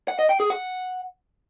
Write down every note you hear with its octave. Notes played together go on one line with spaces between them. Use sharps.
F#5
D#5
G5
G#4
F#5